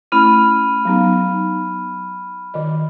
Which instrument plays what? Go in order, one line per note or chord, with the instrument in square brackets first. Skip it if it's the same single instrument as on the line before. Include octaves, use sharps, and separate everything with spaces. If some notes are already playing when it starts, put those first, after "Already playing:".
[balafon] A3 C#4 E4 [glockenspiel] B5 F6 D#7
[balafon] F#3 B3 D#4
D#3 D#5